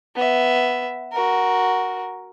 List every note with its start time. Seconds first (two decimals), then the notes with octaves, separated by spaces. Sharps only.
0.15 B3 E5
1.12 F#4 A#4